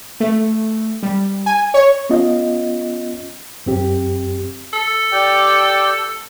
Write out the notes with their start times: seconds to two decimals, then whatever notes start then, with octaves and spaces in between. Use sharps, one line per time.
0.20 A3
1.03 G3
1.46 G#5
1.74 C#5
2.10 B3 C#4 F4 D#5
3.66 F#2 C4 G4
4.73 A4
5.12 G4 D5 G5